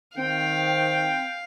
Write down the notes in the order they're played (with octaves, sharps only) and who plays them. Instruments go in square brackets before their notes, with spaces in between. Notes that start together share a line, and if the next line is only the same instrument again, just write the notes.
[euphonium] D#3 [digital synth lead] C4 [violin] F5 [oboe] G5